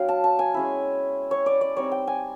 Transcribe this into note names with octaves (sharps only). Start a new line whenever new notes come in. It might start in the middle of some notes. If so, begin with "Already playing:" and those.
Already playing: F#3 B3 D4 F5 G5
A5
A5
G#5
G#3 C#4 E4
C#5
D5
D5
G3 C4 D#4 C#5
G5
G#5